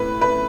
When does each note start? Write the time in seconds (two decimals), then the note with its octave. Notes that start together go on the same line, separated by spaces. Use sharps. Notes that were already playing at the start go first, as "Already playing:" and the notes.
Already playing: A2 A3 B4
0.21 B4